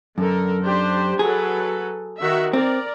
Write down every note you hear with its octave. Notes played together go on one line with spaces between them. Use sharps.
F#2 D3 A4 A#4
D4 G4 C5
F#3 G#4 A4 B4
D#3 F#4 E5
C4 A#4 D5